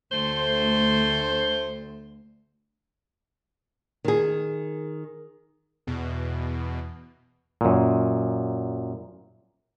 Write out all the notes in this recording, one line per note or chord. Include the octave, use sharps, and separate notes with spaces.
D2 A3 C5
D#3 G#4
E2 B2
F#2 A#2